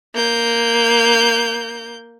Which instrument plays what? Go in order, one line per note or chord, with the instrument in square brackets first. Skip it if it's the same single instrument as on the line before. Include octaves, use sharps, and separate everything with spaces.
[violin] A#3 G6